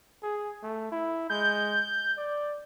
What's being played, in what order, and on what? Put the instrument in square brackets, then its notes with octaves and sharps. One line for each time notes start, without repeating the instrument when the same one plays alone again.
[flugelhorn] G#4
A3
E4
[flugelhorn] G#3 [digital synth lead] G6
[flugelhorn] D5